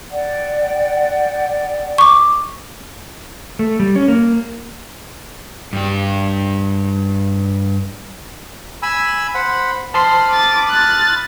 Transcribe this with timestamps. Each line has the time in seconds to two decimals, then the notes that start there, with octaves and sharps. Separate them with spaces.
0.11 D5 F#5 G5
1.98 C#6 D6
3.59 A3
3.80 G3
3.96 C#4
4.08 A#3
5.73 G2 G4
8.82 G#5 B5 E6
9.34 C5 F#5 B5
9.94 C5 A5 B5 C6 D#6 F6 C7
10.30 D6 A6
10.70 F#6 A6